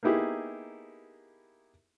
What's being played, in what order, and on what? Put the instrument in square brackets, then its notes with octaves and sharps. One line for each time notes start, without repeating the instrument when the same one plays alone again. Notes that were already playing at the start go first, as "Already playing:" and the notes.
[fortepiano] A#3 B3 D#4 E4 G4 G#4